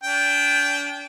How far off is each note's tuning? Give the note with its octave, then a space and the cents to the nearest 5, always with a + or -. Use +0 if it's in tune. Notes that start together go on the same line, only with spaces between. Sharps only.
D4 -40 G5 +0